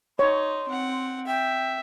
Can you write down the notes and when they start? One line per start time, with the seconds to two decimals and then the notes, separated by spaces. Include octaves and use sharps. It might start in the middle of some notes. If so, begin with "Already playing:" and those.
0.19 D#4 C#5 C6
0.68 C4 F#5
1.27 E5 G5